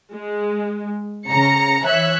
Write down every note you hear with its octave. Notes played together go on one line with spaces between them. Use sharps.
G#3
C#3 A#5 C#7
E3 C#5 E5 F#6